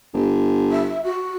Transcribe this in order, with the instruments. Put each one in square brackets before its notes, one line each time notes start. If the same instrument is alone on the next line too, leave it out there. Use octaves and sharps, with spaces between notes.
[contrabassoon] G1
[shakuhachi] E5
F#4